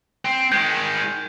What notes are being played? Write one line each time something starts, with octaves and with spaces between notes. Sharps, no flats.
C4
D#3 G#3 G6